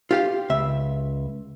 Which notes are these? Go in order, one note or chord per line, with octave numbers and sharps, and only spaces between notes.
F4 G4 F5
C#2 E5